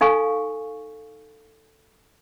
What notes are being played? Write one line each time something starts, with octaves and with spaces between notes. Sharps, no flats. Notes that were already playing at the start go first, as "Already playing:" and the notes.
D#4 A4 F5 G#5 C#6